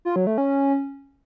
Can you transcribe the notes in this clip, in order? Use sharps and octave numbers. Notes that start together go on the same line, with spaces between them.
F4
F#3
A3
C#4